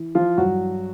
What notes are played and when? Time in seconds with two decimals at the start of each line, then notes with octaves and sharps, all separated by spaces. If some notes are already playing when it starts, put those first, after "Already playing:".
Already playing: E3
0.15 F3 F4
0.38 G2 F#3 F#4